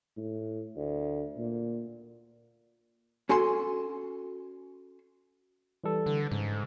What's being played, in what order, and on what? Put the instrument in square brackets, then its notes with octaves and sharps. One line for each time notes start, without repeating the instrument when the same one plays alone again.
[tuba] A2
D2
A#2
[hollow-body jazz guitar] C#4 F#4 A4 G#5 C6
[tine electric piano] E3 G3 A4
[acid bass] D3
[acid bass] G#2 [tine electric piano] C#3